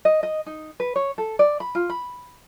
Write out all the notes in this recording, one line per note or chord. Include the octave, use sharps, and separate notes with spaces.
D#5
D#5
D#4
B4
C#5
A4
D5
B5
F4
B5